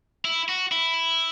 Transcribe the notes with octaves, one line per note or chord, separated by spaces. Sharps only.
E4
F#4
E4